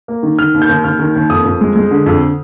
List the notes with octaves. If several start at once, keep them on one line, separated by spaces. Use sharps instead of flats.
A#3
D#3
D#3 F6
D#2
G6
D#2
D#2 F6
D#3
D#2
F2 D#6
F2
G#3
G#3
D3
F2